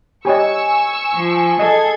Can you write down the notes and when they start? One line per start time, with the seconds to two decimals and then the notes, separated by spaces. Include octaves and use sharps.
0.25 G4 C#5 D#5 G#5 C#6 E6
1.14 F3
1.59 G#4 A4 D#5 G#6